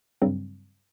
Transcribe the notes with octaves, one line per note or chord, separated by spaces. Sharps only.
G2 C#3 F#3 G3 C4